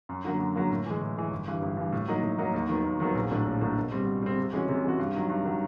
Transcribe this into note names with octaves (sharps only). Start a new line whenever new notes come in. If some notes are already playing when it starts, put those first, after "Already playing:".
F#2
D3 F#3 A#3
F#2
D3 F#3 A#3
A2
E3 G#3
A2
E3 G#3
G1
G2 E3
G1
G2 E3
A2
F#3 A#3 D#4
A2
F#3 A#3 D#4
D#2
D#3 F#3 B3
D#2
D#3 F#3 B3
A#1
A2 F#3 A#3 D4
A#1
A2 F#3 A#3 D4
B2
G3 C4
B2
G3 C4
C3
E3 G#3 C#4 F#4
C3
E3 G#3 C#4 F#4
G2
D#3 F#3
G2
D#3 F#3